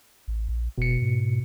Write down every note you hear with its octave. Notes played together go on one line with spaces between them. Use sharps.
A1
A#1
F#1 B2 C#7
G#2